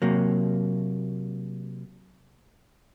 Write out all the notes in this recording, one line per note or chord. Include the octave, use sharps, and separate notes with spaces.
C3 F#3 A#3